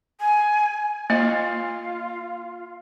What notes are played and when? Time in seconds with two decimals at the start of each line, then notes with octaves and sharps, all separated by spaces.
0.20 G#5
1.10 A#3 F4 D#5